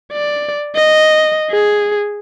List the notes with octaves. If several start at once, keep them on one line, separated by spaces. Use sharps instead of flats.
D5
D#5
G#4